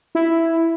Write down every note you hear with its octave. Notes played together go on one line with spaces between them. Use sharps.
E4